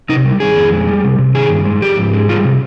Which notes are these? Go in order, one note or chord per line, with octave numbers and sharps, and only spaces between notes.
C3 D#4
G3
D#3 G#4
F2
G#3
G3
C3
C3
D#3 G#4
G2
G#3
F3 G4
G#2
G#3
G3 F4
C3